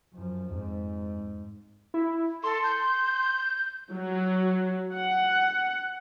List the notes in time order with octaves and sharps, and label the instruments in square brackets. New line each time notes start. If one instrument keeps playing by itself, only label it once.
[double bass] F#2 F3
[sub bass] F2 [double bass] G#2
[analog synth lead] E4
[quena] A4 [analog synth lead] C6
[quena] G6
[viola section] F#3
F#5